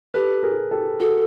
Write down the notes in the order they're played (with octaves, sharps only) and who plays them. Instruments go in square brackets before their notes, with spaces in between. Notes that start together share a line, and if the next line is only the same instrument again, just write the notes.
[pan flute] G4 [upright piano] A4 B4
[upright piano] G#4 A#4
G4 A4
[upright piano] F#4 G#4 [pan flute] A4